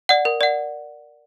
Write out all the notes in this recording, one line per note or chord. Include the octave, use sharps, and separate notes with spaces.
D5 F#5
A#4
D5 F#5